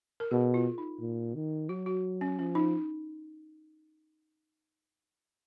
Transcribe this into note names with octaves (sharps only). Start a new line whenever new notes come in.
A#4
B2 G#4
F4
D#4
A#2
D#3
F#3 F#4
F#4
C#4
F3 C#4
D#4